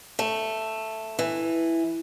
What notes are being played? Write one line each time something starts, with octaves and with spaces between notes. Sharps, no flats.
A3
E3